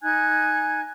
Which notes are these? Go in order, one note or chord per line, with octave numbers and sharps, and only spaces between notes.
D#4 G#5 F#6 G#6